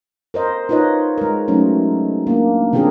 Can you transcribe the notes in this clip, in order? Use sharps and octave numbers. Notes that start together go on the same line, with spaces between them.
A#4 C5 D#5
D#4 F4 B4 C#5 D#5
G#3 A#4
F#3 A3 C#4 D#4
A#3 D4
C#3 F3 C4 D4 G#4 A#4